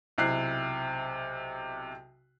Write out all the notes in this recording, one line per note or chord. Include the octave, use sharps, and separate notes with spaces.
B1 C3 E4 F#6 C7